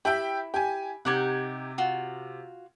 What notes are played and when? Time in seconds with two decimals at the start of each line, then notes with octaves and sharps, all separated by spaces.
0.05 E4 G4 E5 G5
0.54 G4 G#5
1.05 C3 D#4 G4 F#5 G#6
1.78 F4 F#4